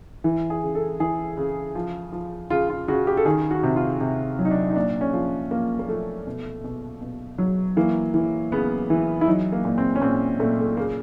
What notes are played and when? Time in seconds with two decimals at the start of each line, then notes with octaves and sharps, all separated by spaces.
0.24 E3
0.50 G#4
0.63 C#3
0.75 A4
1.00 E3 G#4
1.37 C#3
1.75 F3
2.12 F3
2.50 C#3 F4
2.69 F4
2.88 C#3 F#4
3.07 G4
3.17 A4
3.25 D#3 G#4
3.51 F#4
3.63 C3
3.76 F4
4.01 C3
4.39 F#3
4.45 D#4
4.51 D4
4.69 D#4
4.76 A#2 D4
5.01 C#4
5.13 F3
5.51 F3 A#3
5.79 A#3
5.88 F3 A3
6.27 B2
6.64 B2
7.01 B2
7.38 F#3
7.77 E3 A#3
8.14 E3
8.52 C#3 B3
8.90 E3
9.21 E4
9.27 F#3 D#4
9.52 A#3
9.65 A#2
9.78 C4
9.96 C#4
10.02 A#2 C4
10.39 A#2 A3
10.61 A3
10.77 C#3 A#3